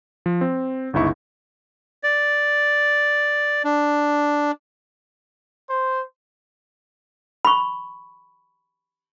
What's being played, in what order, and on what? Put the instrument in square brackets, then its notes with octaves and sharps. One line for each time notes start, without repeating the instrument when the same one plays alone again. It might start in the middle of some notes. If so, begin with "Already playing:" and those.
[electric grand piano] F3
C4
G1 C#2 D#4 E4 C#6
[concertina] D5
D4
[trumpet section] C5
[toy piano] B5 C#6